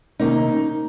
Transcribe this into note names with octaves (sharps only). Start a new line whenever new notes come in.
C3 D#3 A#3 C#4 D#4